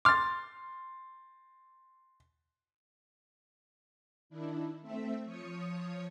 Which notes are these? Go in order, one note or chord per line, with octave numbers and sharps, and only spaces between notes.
C6 D6 F6 A6
D#3 D4 E4
A3 C4 E5
F3 C#5 D#6 C#7